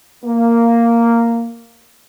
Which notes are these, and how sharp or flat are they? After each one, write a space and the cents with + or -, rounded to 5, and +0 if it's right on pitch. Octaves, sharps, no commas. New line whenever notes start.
A#3 -5